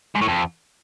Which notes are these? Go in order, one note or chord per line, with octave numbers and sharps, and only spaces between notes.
G#2
A2
F2